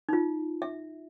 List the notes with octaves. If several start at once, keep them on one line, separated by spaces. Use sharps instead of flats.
D#4 F4
E5